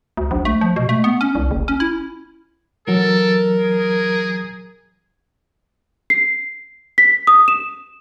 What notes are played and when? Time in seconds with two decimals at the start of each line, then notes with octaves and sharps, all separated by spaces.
0.17 D2
0.31 A#1
0.45 A3
0.61 F3
0.76 B2
0.89 A3
1.04 B3
1.21 C#4
1.35 C2
1.51 F#1
1.68 C#4
1.80 E4
2.88 E3 F#3 A4 A#4
3.59 G#4
6.10 C7
6.98 B6
7.27 D#6
7.48 E7